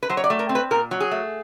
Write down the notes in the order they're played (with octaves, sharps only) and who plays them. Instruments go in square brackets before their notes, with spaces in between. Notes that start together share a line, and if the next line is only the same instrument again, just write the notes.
[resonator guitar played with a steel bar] B4
F#3 C5
C#5
D5
A3
A#4
C4
B4
A#2 A#4
F#3
G#4
A3